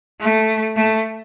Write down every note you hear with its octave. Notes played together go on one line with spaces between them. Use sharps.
A3
A3